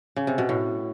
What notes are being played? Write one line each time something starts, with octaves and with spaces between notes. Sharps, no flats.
C#3
C3
B2
A2